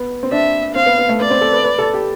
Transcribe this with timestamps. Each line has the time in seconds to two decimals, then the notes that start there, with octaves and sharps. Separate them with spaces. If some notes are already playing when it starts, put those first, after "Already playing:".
Already playing: B3
0.23 C4
0.31 D4 E5
0.75 C4 F5
0.86 B3
0.98 B3
1.09 A3
1.20 B3 D5
1.30 C4
1.41 A4
1.53 B4
1.64 B4
1.79 A4
1.94 G4